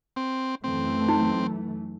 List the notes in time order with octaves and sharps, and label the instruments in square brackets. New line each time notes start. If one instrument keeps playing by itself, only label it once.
[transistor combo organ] C4
[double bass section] F#2 E3 A3 [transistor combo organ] C4
[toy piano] D#4